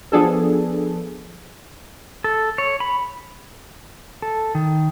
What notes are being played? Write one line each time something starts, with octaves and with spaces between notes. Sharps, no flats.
F3 B3 D4 G#4 A4
A4
C#5
B5
A4
D#3